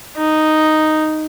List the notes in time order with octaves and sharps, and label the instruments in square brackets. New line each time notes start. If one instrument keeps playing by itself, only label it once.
[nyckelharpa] D#4